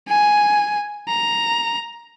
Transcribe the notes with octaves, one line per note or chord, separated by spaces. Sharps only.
G#5
A#5